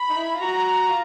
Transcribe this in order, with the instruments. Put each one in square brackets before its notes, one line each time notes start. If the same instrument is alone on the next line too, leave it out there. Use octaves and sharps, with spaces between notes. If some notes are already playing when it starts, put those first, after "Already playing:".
Already playing: [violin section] B5
[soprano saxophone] D#4
E4
F4
[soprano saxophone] F#4 [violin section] A#5
[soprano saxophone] F4